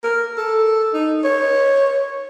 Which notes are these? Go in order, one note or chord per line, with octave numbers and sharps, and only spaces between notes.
A#4
A4
D#4
C#5